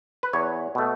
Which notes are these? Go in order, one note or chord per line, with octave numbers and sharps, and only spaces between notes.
B4
E2 C#5
B2 A3